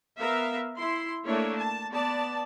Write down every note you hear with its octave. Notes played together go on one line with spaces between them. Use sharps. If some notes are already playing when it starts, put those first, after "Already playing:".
B3 A#4 E5 F5
E4 C6
A3 A#3 D4 E4 C#5
A5
B3 D5 A5